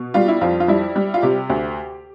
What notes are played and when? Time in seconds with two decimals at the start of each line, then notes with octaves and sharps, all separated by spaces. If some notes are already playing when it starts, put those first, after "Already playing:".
Already playing: B2
0.14 G3 F4
0.28 E4
0.41 F2 F4
0.60 F4
0.68 G3 E4
0.96 G3
1.14 F4
1.22 C3 G4
1.50 D2